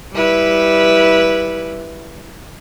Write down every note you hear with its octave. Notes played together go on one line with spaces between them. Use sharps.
G3 E4 B4